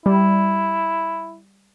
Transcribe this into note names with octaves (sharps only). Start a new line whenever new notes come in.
G3 E4